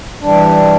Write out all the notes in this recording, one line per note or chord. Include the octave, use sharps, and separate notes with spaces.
E3 G3 D4